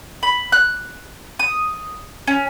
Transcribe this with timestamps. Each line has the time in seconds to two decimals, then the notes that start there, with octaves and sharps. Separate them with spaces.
0.23 B5
0.52 F#6
1.39 D#6
2.27 C#4